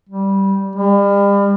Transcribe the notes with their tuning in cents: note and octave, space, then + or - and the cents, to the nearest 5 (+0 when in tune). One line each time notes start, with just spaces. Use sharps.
G3 -10
G3 +40